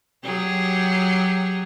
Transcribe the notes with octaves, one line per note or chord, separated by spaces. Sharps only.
F#3 G4 G#4